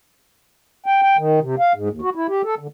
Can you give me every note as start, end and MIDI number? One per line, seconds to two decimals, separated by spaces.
0.86 1.01 79
1.02 1.17 79
1.17 1.40 51
1.41 1.55 48
1.59 1.73 77
1.74 1.89 44
1.90 2.01 39
2.02 2.10 66
2.15 2.27 64
2.28 2.42 67
2.44 2.55 69
2.59 2.67 50